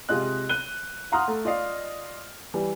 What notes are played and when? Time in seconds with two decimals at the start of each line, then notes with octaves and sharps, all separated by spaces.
0.09 C3 G#3 F4 D#5 F#6
0.49 F#6 D#7 G7
1.12 F5 F#5 A#5 C6 D#6 F6
1.28 A3
1.45 F4 D5 D#5 F5
2.54 E3 G3